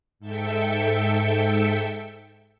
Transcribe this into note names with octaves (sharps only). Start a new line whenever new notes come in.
G#2 A4 E5 G5 C#7